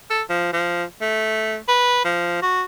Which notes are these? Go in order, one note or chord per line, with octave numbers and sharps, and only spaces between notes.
A4
F3
F3
A3
B4
F3
F#4